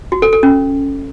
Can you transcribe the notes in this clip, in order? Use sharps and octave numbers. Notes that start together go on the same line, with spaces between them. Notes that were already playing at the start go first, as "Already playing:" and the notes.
F#4
A4
A4
C#4